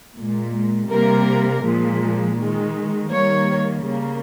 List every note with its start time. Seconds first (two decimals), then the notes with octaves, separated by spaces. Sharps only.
0.17 A#2 G#3
0.90 C3 G3 A#3 A#4
1.64 A#2 F3 G#3
2.38 D#3 G#3
3.10 D#3 G3 A#3 C#5
3.84 C#3 G3 A#3